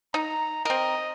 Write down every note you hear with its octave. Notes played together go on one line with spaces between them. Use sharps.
D#4 A#5
C4 A#4 D#5